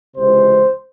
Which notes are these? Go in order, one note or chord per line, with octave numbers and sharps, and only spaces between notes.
C#2 C3 E3 G#3 C5